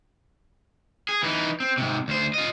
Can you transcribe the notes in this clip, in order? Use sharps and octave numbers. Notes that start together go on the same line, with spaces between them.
G#4
E3 D#4
C4
G#2 C3
D2 C5
F4 D#5